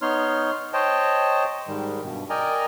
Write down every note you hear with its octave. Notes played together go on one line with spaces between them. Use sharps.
B3 D#4 C#5 C6 F6
C5 C#5 D#5 G5 A5
G#2 D#3 G3
G2 B2
A#4 D5 D#5 G5 G#5 A#5